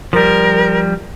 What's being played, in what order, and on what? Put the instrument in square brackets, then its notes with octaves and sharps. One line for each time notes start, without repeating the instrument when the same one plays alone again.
[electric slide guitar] F3 G3 [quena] A#4